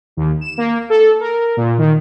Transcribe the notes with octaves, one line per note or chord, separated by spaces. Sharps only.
D#2
E7
A#3
A4
A#4
A#2
D#3